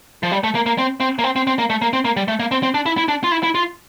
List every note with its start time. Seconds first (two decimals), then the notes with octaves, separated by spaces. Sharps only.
0.23 F3
0.31 G3
0.44 A3
0.55 A#3
0.66 A#3
0.78 C4
1.00 C4
1.19 A#3
1.24 C4
1.36 C4
1.47 C4
1.59 A#3
1.70 A3
1.82 A#3
1.93 C4
2.05 A#3
2.17 G3
2.28 A3
2.40 A#3
2.51 C4
2.63 C4
2.74 D4
2.86 E4
2.97 E4
3.08 D4
3.24 F4
3.32 E4
3.43 E4
3.55 F4